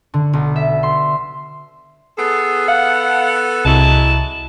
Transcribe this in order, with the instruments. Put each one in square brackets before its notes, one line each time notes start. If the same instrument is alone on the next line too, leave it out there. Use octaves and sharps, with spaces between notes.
[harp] D3
B1
E5
C6
[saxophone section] B3 A4 [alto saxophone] G#4
[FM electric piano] F5 [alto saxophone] F#5
[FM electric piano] C2 C3 [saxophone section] F#3 G#3 E4 [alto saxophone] A5